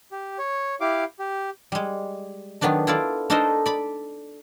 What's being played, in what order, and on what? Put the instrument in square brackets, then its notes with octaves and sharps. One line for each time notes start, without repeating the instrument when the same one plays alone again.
[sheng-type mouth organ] G4
C#5
E4 G4 F5 D6
G4
[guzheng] G3 G#3
D#3 F#3 B3 D4 D#4
E4 F4 A4 D5
D4 D#4 A4 A#4 C5 D#5
D5 B5